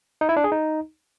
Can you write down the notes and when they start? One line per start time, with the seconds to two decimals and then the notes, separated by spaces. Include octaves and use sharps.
0.21 D#4
0.29 E4
0.36 D4
0.44 G#4
0.52 D#4